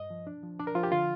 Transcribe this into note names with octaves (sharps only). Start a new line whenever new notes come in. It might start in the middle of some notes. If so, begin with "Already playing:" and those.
Already playing: G2 D#5
F3
D4
F3
D4 D5
A#4
F3 F4
G4
D3 F4